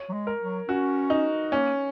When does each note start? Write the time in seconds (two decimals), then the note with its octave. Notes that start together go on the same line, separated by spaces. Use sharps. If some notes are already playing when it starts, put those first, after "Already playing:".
Already playing: C#5
0.09 F#3
0.13 G#3
0.27 A#4
0.41 F#3
0.69 C#4 F#4
1.10 D#4
1.52 A#3 C#4